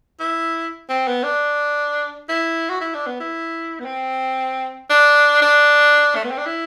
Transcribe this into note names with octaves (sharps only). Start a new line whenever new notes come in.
E4
C4
B3
D4
E4
F#4
E4
D4
B3
E4
B3
C4
D4
D4
A3
B3
C4
D4
E4